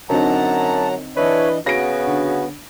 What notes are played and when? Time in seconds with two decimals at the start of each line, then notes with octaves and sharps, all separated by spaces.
0.10 F#2 D3 F#3 C4 D#4 F#5 A5 A#5
1.17 E3 D4 E4 B4 C#5 D#5
1.66 C#3 B3 F#4 B4 A#6 D7
2.07 D3